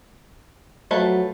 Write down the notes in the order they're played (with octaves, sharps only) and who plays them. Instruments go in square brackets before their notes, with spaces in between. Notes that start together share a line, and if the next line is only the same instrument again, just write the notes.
[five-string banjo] F3 A3 B4 [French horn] F#3